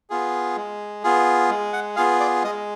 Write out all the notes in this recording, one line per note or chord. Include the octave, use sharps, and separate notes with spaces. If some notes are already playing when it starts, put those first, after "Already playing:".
B3 F4 G#4
G#3
B3 F4 G#4
G#3
F#5
B3 F4 G#4 F5
D5
G#3 D#5